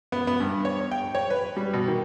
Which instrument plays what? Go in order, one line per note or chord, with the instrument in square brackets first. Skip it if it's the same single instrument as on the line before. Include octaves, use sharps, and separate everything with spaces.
[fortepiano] B3
B3
G2
C#5
G5
C#5
B4
G3
B2
D#3